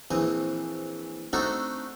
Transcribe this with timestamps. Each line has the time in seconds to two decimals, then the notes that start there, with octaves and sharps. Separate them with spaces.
0.11 A#1 E3 C4 D#6
1.33 A3 C4 D4 D#4 F#4 A4